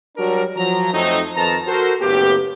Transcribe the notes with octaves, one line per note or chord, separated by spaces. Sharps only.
F#3 G3 D4 F#4 A#4
F3 F#3 A#5
F2 F#3 A3 C4 D#4
F2 D#3 B4 A5 A#5
F#4 A4 A#4 C5
F#1 A2 A#3 B3 G4